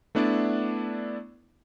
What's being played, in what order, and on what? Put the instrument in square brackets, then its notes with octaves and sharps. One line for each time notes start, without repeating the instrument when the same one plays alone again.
[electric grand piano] A3 B3 D4 E4 D5